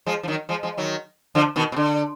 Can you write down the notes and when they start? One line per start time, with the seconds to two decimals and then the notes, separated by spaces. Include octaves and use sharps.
0.06 F3 G#3
0.23 F3
0.28 D#3 F#3
0.49 F3 G#3
0.63 F3 G#3
0.77 D#3 F#3
1.35 D3 F3
1.56 B2 D#3
1.72 B2
1.76 D3